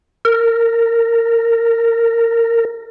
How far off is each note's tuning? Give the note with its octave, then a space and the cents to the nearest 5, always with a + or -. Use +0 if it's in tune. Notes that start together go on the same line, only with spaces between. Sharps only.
A#4 -20